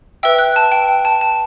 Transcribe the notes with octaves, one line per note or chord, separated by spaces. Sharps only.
B4 E5 G5 E6
F#6
A5
G5
G5
A5
A5